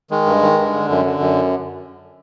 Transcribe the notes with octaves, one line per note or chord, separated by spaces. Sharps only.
D#3 G#3
G2
D#3
G2
D3
F#2
D3
F#2